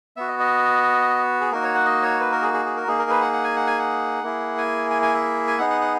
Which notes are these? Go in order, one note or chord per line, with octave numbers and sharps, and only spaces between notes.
B3 F#4 E5
D#5
D#5
G#4
A#3 D#4 F#4 A#4
C#5
F#5
D#5
C#5
B4
A#4
G#4
G#4
G#4
A#4
A#3 D#4 G#4
A#4
B4
F#5
F#5
G#5
F#5
G#5
F#5
A#3 E4 G#4
G#5
G#5
G#5
E5
G#5
B3 D#4 G#4 F#5
F#5
F#5